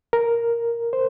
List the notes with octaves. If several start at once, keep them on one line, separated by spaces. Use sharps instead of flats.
A#4
C5